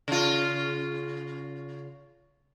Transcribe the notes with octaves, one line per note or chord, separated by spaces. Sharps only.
C#3 F4